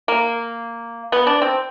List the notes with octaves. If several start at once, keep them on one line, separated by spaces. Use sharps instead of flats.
A#3
B3
D4
C4